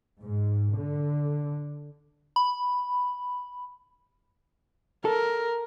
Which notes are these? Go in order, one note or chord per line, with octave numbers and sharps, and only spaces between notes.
G#2
D3
B5
A4 A#4